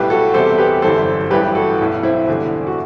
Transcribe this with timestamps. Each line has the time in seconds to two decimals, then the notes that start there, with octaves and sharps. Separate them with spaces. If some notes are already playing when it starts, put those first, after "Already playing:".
Already playing: B1 A2 G3 G4 B4
0.10 F#4 A4
0.34 E2 C3 G3 A4 C5
0.58 G4 B4
0.82 G1 F#2 E3 G3 A4 C5
1.31 A1 G2 E3 G3 G4 B4
1.55 F#4 A4
1.79 B1 A2 F#3
2.03 C4 E4
2.27 E2 D3 G3
2.67 F#4